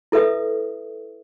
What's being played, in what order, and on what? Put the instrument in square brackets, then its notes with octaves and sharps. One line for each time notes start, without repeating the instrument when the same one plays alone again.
[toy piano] E4 A4 B4 E5 D#6